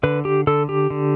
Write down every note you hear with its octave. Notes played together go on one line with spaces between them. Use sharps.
D3 B4
G4
D3 A4
G4
D3